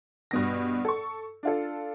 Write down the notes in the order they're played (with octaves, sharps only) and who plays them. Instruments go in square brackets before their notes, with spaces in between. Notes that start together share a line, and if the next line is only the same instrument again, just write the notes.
[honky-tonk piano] G2 B2 A#6
A4 C#6
D4 F4 A4